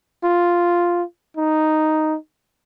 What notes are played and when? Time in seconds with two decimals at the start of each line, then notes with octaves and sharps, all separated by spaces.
0.24 F4
1.37 D#4